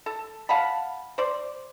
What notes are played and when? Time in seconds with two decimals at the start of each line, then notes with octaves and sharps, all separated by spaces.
0.06 A4
0.49 F5 F#5 A5 B5
1.18 C5 D5